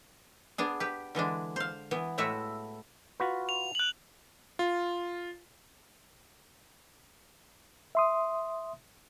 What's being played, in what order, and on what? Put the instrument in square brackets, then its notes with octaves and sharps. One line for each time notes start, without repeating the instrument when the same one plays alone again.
[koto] B3 D4 G#4
G4 B4
D3 E3 G#3 D4
C5 F5
E3 B3
A2 G#3 A3 E4 F#4 E5
[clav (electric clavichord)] F4 F#4 B4
[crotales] F7
F#6 F#7
[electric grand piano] F4
[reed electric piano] E5 C6 D#6